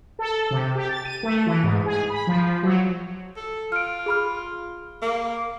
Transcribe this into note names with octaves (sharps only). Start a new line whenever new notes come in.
A4
C3
G4
A6
D#7
A3
E3
G#2
G#4
B5
F3
F#3
A4
F4 F6 D7
G#4 B5 F6
A#3